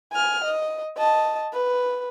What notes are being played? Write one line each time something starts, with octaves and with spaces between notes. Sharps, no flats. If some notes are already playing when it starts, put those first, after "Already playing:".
G#5 F6
D#5
D#5 A5
B4